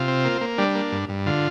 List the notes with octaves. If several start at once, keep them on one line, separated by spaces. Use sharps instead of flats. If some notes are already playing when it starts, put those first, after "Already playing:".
Already playing: C3 F4
C4
A#3
A#3
G3 D4
A#3
G2
G2
D3 F4